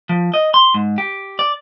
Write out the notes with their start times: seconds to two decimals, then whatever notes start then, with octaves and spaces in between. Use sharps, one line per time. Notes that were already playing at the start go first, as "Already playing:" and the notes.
0.09 F3
0.34 D#5
0.54 C6
0.74 G#2
0.98 G4
1.39 D5